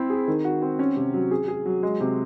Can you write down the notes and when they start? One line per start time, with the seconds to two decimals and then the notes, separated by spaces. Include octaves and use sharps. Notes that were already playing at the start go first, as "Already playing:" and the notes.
Already playing: C4 E4
0.10 G#4
0.28 D#3
0.44 F#4
0.62 C4
0.79 C#4
0.97 C3
1.14 F#3
1.31 G#4
1.48 G#4
1.65 F#3
1.83 G#3
2.01 C3